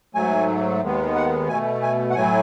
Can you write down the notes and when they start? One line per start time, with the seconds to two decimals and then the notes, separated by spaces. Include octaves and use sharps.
0.15 G#2 F#3 A3 G#5
0.82 D#2 D#3 G#3 B3
1.15 F#5
1.48 B2 A3 G#5
1.82 G#5
2.10 F#5
2.15 A2 F#3 A3 G#5